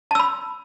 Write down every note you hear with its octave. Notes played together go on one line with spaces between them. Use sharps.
A5 B5 E6